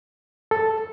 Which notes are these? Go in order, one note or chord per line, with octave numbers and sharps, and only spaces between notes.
A4